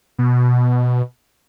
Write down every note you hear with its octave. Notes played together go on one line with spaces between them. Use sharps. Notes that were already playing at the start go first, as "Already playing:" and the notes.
B2